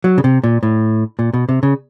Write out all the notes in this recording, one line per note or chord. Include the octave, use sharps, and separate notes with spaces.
F#3
C#3
C3
A#2
A2
A#2
B2
C3
C#3